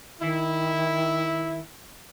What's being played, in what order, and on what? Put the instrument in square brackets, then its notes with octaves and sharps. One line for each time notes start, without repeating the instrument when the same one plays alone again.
[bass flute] D#3 [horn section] E4